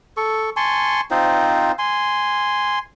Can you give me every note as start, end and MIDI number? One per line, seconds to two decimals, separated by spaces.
0.17 0.50 69
0.17 0.50 85
0.57 1.01 80
0.57 1.01 81
0.57 1.01 84
0.57 1.01 85
1.11 1.72 60
1.11 1.72 63
1.11 1.72 65
1.11 1.72 72
1.79 2.79 80
1.79 2.79 84